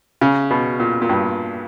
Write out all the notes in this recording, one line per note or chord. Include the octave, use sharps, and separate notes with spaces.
C#3
B2
A#2
A#2
G2